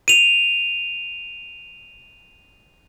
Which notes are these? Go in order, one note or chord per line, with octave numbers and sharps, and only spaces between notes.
D#7 F7